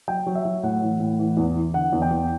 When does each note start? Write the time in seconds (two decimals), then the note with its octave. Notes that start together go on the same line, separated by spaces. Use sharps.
0.08 F#3 G5
0.26 F#3
0.35 E5
0.45 F#3
0.63 A2 F#5
0.82 E3
1.00 A2
1.19 E3
1.37 E2
1.56 E3
1.74 D3 F#5
1.93 E2
2.02 G5
2.11 E2